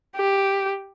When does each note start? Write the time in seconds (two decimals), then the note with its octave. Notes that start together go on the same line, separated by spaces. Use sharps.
0.16 G4